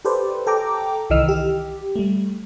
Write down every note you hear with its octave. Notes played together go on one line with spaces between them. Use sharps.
G4 A4 B4 C5 D5
A4 G5 A#5 D6
C2 D#3 E3 D#5 E6 F6
G4
G3 A3